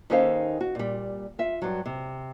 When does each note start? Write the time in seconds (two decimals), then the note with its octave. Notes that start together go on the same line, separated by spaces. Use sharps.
0.10 D#2 C#4 D#4 A4 C5 F5
0.61 F#4
0.75 A#2 G3
1.39 F4 E5
1.62 G2 F#3
1.86 C3